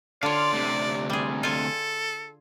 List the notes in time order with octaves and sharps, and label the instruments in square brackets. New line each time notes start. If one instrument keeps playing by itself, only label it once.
[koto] D3 C#5 [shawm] D5 [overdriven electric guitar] F5 C6
[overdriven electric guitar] D2 C3
[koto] G3 G#4
[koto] F4 G#5 [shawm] A4